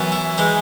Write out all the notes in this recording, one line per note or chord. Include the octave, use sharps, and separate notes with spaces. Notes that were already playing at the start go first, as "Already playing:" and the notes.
Already playing: F#2 E3 B3
E4
E3 G#3 D#4